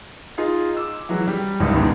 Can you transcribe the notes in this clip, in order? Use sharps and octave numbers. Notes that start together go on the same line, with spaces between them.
D#4 F4 G#4
D6 E6
E3 F#3 G#3
G3
G#1 C#2 F#2 D#3 D5 D#6
G#2 B2 D#3